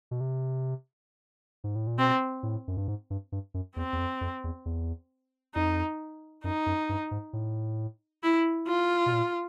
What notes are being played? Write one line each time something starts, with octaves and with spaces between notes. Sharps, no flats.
B2
C3
G#2
A2
A#2
B2 C4
A2
F#2
G2
G#2
G2
G2
F#2
E2 C4
E2
F2
F2
E2
E2
F2 D#4
F#2 D#4
F#2
G2
G#2
A2
E4
F4
B2
A#2